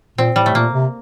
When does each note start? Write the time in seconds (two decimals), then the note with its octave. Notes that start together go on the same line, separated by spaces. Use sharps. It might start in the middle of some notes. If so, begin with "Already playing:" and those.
0.18 A#2 C4
0.36 A2 G3
0.46 A3
0.54 A#2 A#3
0.74 C3